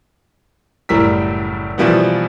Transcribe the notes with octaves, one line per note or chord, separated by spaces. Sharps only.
F#1 A2 G3 A#4 E6 B6
B2 E3 F3 G3 A#3 B3